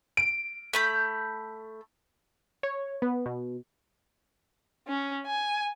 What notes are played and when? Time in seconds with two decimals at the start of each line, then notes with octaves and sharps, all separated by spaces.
0.17 D7
0.73 A3 B5 G6
2.63 C#5
3.02 B3
3.26 B2
4.88 C#4
5.26 G#5